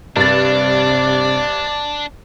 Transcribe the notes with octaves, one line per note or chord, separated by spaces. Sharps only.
G2 C3 D4 D5 A6